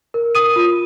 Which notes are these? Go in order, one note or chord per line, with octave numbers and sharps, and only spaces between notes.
A#4
A#4 D#6 D#7
F4